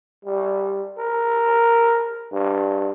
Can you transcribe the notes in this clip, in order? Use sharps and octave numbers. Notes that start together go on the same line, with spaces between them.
G3
A#4
G2